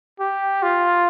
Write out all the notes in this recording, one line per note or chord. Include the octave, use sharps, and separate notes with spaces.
G4
F4